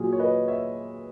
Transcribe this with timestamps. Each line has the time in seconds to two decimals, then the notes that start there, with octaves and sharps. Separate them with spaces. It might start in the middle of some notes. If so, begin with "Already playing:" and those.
Already playing: A#2 F#3 G#4
0.12 C#5
0.19 B4 D#5
0.48 C#5 E5